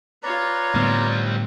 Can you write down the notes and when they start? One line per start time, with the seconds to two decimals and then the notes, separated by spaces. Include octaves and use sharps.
0.23 F4 B4 C#5 D5 A#5
0.75 A2 D3 G3 B3 C4